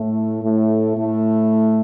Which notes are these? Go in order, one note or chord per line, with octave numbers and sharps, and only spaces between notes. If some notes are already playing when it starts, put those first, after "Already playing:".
Already playing: A2 A3
A2 A3
A2 A3